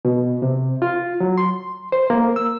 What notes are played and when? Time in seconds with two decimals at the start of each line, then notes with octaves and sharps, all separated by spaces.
0.05 B2
0.42 C3
0.82 F4
1.20 F#3
1.38 C6
1.92 C5
2.10 A#3
2.36 E6